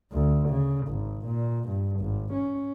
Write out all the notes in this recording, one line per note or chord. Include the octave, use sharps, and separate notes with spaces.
D2
C#3
G#1
A#2
G2
G#1
C#4